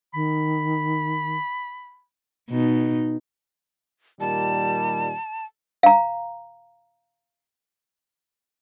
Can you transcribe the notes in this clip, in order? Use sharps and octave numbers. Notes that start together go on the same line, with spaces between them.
D#3 B5
B2 D#4
A#2 D#3 G3 A5
F5 A#5